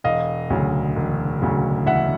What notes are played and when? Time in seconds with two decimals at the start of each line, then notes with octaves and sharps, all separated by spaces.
0.04 E1 D#5 F5
0.50 D2 C#3 F#3
0.96 E1
1.42 D2 C#3 F#3
1.86 E1 E5 F#5